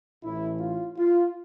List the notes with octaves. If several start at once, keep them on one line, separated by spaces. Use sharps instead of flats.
A1 A2 E3 E4
F4
F4